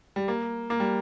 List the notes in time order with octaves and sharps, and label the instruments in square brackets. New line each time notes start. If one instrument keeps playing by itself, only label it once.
[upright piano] G3
A#3
A#3
G3